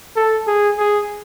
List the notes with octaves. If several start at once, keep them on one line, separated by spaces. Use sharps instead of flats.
A4
G#4
G#4